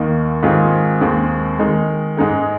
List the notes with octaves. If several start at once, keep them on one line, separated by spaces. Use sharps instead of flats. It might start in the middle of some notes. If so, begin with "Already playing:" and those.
Already playing: D#2 D#3 A#3 D#4
G#2 D#3 C4 F4 G#4
D#2 D#3 G#3 C4
D#3 G#3 D#4
G#2 G#3 D#4 G#4